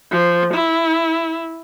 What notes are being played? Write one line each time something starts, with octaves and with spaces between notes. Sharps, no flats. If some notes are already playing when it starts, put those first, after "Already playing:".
F3
E4